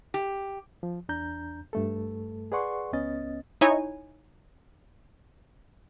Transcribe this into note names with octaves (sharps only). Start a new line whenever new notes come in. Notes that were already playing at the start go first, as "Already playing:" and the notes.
G4
F3
E2 D4 A#5 G6
G2 A3 A4
G#4 B4 D5 F#5 C6 C#6
C#2 B3 C#4 D#5 A6
D#4 E4 C#5 G#5